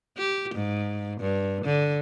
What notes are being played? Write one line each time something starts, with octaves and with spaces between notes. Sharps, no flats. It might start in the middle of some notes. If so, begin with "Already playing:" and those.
G4
G#2
G2
D3